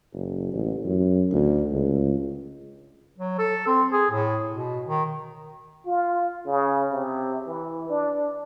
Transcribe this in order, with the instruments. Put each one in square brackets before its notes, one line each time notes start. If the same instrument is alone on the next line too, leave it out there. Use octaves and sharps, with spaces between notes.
[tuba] F#1
A1
F#2
D2
C#2
[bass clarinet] F#3
A4
C4
G#4
A2
B2
D#3
[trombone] F4
C#3
C3
E3
D4